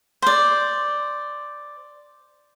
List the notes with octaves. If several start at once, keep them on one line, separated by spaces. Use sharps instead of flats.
C5 D5